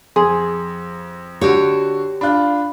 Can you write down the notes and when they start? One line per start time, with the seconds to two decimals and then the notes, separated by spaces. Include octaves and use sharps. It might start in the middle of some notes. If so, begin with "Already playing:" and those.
0.16 F2 G#4 C6
1.41 D3 F#4 G4 C#5
2.21 D4 F4 B5 F#6